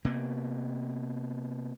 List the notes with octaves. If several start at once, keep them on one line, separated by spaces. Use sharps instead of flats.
C3 A#3 B3